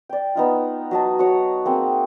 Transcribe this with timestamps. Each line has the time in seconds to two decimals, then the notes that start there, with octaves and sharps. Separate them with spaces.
0.09 D5 G5
0.35 B3 D#4 F4
0.91 F#3 D#5 A5
1.19 F#4 C#5
1.65 A#3 C4 G#4